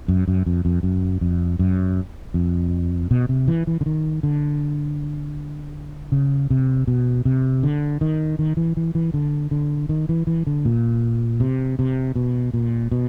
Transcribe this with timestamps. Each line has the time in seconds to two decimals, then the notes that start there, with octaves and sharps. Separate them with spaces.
0.08 F#2
0.28 F#2
0.46 F2
0.65 F2
0.83 F#2
1.21 F2
1.59 F#2
2.34 F2
3.11 B2
3.29 C3
3.48 E3
3.67 E3
3.81 D3
3.86 D#3
4.23 D3
6.12 C#3
6.50 C3
6.87 B2
7.25 C3
7.63 D3
8.01 D#3
8.39 D#3
8.57 E3
8.77 E3
8.95 E3
9.14 D3
9.51 D3
9.89 D#3
10.09 E3
10.27 E3
10.47 D3
10.65 A#2
11.40 C3
11.79 C3
12.16 B2
12.54 A#2
12.91 B2